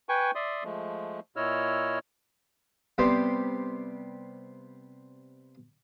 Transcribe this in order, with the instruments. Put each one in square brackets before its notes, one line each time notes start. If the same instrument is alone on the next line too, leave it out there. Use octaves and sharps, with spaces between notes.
[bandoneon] B4 G5 G#5 C#6
D5 E5 C6 D#6
F3 G#3 A3
A#2 E4 C#5 D#5 E6 F6
[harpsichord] C3 G3 B3 G4 C5